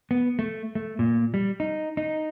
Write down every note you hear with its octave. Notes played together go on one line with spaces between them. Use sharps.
B3
A3
A3
A#2
G3
D#4
D#4